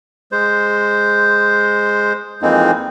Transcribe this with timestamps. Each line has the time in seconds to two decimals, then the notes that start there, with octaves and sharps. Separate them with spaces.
0.32 G#3 C5
2.42 F2 E3 G#3 A#3 C4 D#4